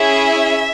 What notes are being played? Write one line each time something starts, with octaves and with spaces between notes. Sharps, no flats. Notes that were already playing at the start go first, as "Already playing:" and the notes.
Already playing: C#4 E4 G#4 E5